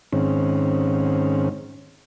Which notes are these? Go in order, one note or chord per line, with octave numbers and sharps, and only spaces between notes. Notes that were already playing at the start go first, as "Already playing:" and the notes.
G#2 D#3 C4 C#4